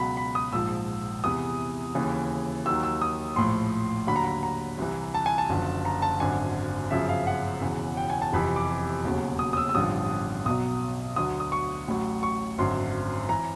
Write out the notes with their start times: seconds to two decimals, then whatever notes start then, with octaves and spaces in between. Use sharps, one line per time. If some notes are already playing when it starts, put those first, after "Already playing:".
Already playing: C#2 B2 F#3 B5
0.17 B5
0.35 D#6
0.53 A#1 G#2 F3 E6
1.24 E2 C3 E3 D#6
1.95 D#2 C#3 E3
2.66 D#2 D#3 F#3 E6
2.83 E6
3.02 D#6
3.36 A#1 A2 F3 C6
4.07 D#2 D3 F#3 B5
4.16 A#5
4.25 B5
4.43 A#5
4.78 C2 C3 E3
5.14 A5
5.26 G#5
5.38 A5
5.49 F#1 F#2 D3 F3
5.85 A#5
6.02 A5
6.20 G#1 F#2 D3 F#3 G#5
6.91 G1 F#2 C#3 F3 E5
7.09 F5
7.27 F#5
7.61 E1 E2 C#3 E3
7.97 G5
8.10 G#5
8.22 A5
8.33 F1 F2 C3 E3 B5
8.56 D6
9.04 E1 D#2 C#3 F#3
9.39 D#6
9.53 D#6
9.57 E6
9.69 E6
9.74 A1 G2 D3 F3 D#6
10.45 B1 B2 F#3 D#6
11.16 D2 D3 F#3 D#6
11.40 D#6
11.52 C#6
11.87 A1 A2 F#3
12.23 C#6
12.58 G#1 F#2 D3 C6
13.29 E3 A#5